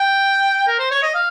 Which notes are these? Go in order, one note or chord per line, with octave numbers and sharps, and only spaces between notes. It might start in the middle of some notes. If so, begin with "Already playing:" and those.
Already playing: G5
A#4
C5
C#5
D#5
F5